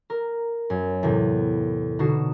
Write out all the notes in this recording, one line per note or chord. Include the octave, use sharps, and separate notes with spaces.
A#4
F#2
E2 A2 C3
B2 D3 D#4 F#4 C7 E7